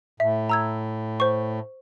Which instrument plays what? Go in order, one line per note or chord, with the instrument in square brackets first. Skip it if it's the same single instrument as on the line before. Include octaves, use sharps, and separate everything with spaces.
[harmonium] A2 [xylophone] E5
[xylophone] A#5 E6 G#6
C5 C#6